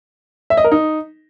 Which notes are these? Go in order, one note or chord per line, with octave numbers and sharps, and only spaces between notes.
E5
D#5
A#4
D#4